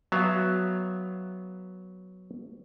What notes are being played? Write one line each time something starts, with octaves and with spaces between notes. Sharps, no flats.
F#3 B3 E5 F5